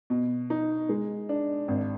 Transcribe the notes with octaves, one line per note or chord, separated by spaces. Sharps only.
B2
D#4
G#3
D4
G#1